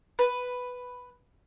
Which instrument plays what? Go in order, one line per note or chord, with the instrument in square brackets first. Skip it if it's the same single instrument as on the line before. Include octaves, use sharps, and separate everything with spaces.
[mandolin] B4